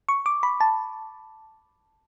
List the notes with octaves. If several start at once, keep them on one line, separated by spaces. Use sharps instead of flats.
C#6
D6
B5
A5